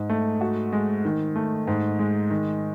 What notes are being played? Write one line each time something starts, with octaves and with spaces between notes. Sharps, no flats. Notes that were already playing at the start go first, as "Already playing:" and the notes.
Already playing: G#2
A3
F#4
G#3
D#3
A3
G#2
G#3
D#3